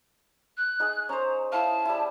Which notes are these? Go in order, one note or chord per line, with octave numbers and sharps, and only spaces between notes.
F#6
D#4 G#4 G#5
C#4 C5 A#5
E4 F5 A5
G3 E4